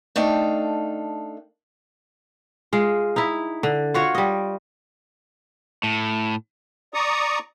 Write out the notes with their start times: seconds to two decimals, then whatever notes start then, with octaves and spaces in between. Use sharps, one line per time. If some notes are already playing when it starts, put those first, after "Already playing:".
0.16 A3 D4 D#4 A4 F5 G5
2.73 G#3 F4
3.16 D#4 E4
3.63 D3
3.94 F4 F#4 C#5
4.15 G3 D#5
5.83 A2
6.94 D5 A#5 C#6 D#6